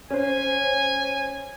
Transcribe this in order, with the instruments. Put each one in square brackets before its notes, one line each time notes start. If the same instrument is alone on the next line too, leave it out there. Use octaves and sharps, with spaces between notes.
[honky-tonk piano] C#4 C5 [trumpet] G#5